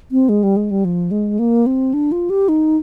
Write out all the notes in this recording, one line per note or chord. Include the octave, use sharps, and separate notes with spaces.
C4
G#3
G3
G#3
G3
F3
G#3
A#3
C4
D4
F4
G4
D#4